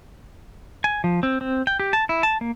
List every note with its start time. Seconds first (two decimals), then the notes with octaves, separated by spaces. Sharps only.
0.84 G#5
1.04 F3
1.23 C4
1.41 C4
1.67 G5
1.80 G4
1.93 A5
2.09 E4
2.23 A5
2.41 A#3